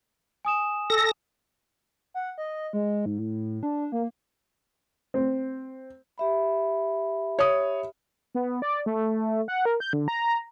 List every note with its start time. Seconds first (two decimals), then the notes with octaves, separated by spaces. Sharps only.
0.45 G#5 D#6 E7
0.90 A4 A#6
2.14 F#5
2.38 D#5
2.73 G#3
3.06 G#2
3.19 A2
3.63 D4
3.92 A#3
5.14 C4
6.18 G4 E5 B5
7.39 C#5 D#6
8.35 B3
8.62 D5
8.86 A3
9.48 F#5
9.65 A#4
9.80 G6
9.93 D3
10.08 A#5